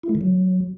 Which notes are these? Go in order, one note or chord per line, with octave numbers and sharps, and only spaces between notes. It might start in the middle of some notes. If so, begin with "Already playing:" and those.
E4
A3
D#3
F#3